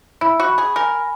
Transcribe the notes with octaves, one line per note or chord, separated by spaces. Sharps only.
E4 B5
F#4
B5
G#4
A#4 G#5